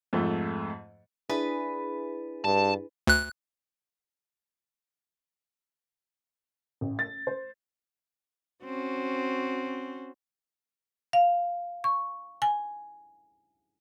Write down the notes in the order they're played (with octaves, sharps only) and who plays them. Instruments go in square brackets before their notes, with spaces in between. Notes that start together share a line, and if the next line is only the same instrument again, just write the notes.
[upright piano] F2 G#2 F3 A3
[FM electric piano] D4 E4 G#4 [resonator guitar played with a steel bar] B4
[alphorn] G2 [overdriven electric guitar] A5
[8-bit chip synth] D2 F#6
[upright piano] A1
A6
C5
[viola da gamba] C4 C#4 F#4
[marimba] F5
C#6
G#5